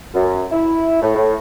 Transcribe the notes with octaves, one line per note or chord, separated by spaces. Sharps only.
F#2
E4
A2
A2